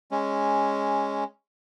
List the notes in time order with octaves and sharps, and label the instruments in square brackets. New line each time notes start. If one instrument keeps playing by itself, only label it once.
[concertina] G#3 C#4